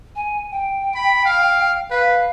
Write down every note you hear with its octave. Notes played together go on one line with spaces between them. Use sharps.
G#5
G5
B5
F5
B4 F5